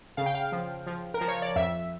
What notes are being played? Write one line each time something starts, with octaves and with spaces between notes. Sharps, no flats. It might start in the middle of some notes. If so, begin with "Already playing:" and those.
C#3 F5
G5
F5
F3
F3
A#4
F3
C#5
D5
F2 E5